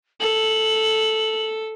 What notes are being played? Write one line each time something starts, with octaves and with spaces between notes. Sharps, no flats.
A4 F#7